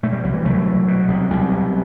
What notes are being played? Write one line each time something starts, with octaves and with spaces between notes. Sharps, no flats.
B2 A3
G3
C2 F#3
E3 G3
C2 F#3 A3
B2
B2
C2
C2
B2